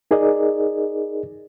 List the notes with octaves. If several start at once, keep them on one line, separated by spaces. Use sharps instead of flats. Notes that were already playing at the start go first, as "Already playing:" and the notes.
D#4 G#4 A#4 D5 D#5